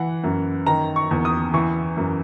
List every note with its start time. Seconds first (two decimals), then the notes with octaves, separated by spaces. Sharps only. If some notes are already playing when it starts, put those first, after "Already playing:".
Already playing: E3 F#5
0.24 F#2
0.67 D#3 A#5
0.96 C#6
1.11 E2
1.25 D#6
1.54 E3 C#6
1.97 F#2